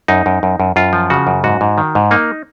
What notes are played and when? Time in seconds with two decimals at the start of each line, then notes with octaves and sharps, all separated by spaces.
0.08 F#2 D#4
0.26 F#2
0.43 F#2
0.60 F#2
0.76 F#2 F4
0.93 F3
1.10 C#3 F#4
1.27 F#2
1.44 G#2 F#4
1.61 G#2
1.78 D#3
1.95 G#2
2.11 A#3 D#4